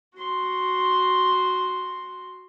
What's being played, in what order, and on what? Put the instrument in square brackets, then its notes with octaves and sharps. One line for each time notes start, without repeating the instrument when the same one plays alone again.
[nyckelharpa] F#4 C6